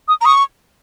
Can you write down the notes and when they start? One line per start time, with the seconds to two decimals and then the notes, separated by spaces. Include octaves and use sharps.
0.08 D#6
0.21 A#5
0.25 C#6 D#6